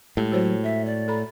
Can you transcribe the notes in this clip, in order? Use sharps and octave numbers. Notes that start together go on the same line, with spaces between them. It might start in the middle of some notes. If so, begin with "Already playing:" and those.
A2 G#3 G4
F#3 F#4 C5 C#5
E5
D5
A4 A#5 B5